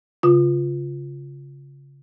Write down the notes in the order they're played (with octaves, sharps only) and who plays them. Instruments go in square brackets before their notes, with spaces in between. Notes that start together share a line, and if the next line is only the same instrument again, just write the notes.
[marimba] C#3 F4 D#6